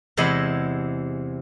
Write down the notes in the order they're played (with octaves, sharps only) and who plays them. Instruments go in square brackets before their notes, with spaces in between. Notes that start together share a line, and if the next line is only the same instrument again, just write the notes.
[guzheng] E2 C3 G#3 E4 D#5 B5